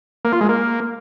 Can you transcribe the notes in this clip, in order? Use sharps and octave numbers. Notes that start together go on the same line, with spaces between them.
A#3
F4
G#3
A#3